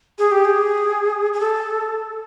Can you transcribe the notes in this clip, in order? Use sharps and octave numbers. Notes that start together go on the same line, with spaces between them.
G#4
G4
G#4
G#4
A4